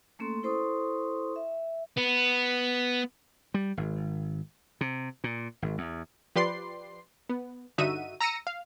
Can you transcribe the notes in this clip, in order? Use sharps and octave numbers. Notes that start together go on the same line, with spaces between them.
A3 A#3 C#4 A4 C6
E4 A4 C5 C6 C#6 D#6
E5
B3
G3
G#1
C3
A#2
G#1
E2
F3 G4 B4 D5 C6 C7
B3
G2 D3 D#4 F#4 E5 D#7
A#5 E6 A#6 C#7 D#7
F5